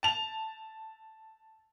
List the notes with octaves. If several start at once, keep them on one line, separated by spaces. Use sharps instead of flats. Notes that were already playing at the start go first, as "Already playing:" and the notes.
A5 F7